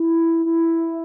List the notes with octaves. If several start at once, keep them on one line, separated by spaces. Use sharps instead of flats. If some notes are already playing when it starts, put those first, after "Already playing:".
Already playing: E4
E4